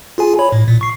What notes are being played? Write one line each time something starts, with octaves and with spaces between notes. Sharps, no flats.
F4 G#4 G#5
C#5 B5
A2
A#2
C#6 C7